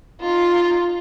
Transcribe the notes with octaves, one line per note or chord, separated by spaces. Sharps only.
D#4 F4